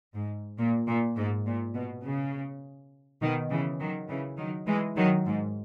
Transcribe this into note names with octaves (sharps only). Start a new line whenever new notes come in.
G#2
A#2
A#2
G#2
A#2
B2
C#3
B2 D#3
C#3 E3
D#3 F#3
C#3 E3
D#3 F#3
E3 G#3
D#3 F#3
G#2